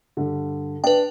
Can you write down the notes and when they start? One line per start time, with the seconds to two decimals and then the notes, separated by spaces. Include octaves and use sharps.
0.17 G2 D3
0.84 D4 B4 G5